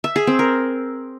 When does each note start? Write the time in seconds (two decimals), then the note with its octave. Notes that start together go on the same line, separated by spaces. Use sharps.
0.04 E5
0.16 G#4
0.27 C4
0.39 A#4